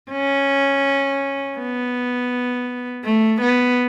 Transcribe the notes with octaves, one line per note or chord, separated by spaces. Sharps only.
C#4
B3
A3
B3